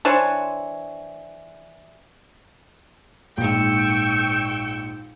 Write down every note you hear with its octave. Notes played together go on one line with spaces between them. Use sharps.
E3 D4 C5 C#5
A#1 G#2 G5 C#6 E6